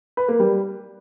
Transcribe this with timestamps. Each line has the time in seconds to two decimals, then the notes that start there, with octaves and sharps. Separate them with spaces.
0.17 B4
0.28 A#3
0.40 G3